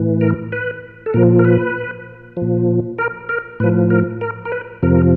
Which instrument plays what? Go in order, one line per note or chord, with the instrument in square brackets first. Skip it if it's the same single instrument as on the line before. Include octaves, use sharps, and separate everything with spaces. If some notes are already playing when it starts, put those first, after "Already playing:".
Already playing: [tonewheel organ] A2 E3
A#4
B4
A4
A#2 F3 A#4
A#4
B4
A#2 F3
A#4
A#4
A2 F3 B4
A#4
A#4
A#4
B4
F2 C3 F3 A#4